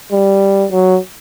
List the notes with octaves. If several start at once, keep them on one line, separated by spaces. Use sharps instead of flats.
G3
F#3